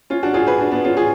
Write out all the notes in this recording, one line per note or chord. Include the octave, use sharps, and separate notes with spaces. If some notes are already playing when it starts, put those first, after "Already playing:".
C#4 F4
D4 F#4
F4 G#4
G#4 B4
D4 F#4
B3 D4
C#4 F4
F4 G#4